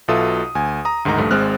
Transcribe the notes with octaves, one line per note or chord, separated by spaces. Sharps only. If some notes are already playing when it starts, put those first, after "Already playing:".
B1 B2 F4 A4 E5 D#6
D2 G#5
A#5 D#6
D2 G#2 D#3 D#4 A#5
A#1 G2 A3
G#1 G#3 C4 F6 F#6